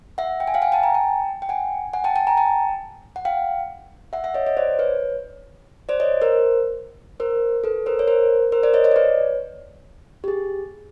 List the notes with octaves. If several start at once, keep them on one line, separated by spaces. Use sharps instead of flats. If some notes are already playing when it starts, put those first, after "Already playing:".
E5 F#5
G5
G#5
F5 G5
F#5 G#5
G5 A5
G#5 A#5
G5 A5
G5
F#5 G#5
F#5 G#5
G5 A5
G5 A5
G#5 A#5
G5 A5
F#5
F5 G5
E5 F#5
E5 F#5
C#5 D#5
C#5 D#5
C5 D5
B4 C#5
C5 D5
C#5 D#5
A#4 C5
A#4 C5
A4 B4
A#4 C5
C#5
A#4 C5
A#4 C5
C5 D5
C#5 D#5
C#5 D#5
D5
B4 C#5
G4
G#4